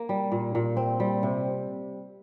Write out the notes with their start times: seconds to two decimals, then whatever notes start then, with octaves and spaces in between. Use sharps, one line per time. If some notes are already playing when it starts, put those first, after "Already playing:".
Already playing: A#3
0.09 G3
0.32 A#2
0.55 A#2
0.77 C4
1.00 G3
1.23 C3